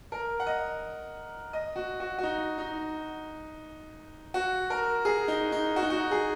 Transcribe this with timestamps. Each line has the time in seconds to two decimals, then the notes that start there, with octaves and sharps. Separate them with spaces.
0.12 A#4
0.40 F#5
0.46 D#5
1.53 D#5
1.76 F#4
2.00 F#4
2.18 F#4
2.23 D#4
2.58 D#4
4.34 F#4
4.70 A#4
5.05 G#4
5.28 D#4
5.52 D#4
5.76 F#4
5.82 D#4
5.90 F#4
5.99 D#4
6.11 G#4